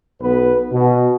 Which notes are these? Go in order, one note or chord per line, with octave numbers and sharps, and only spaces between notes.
B1 B3 B4
B2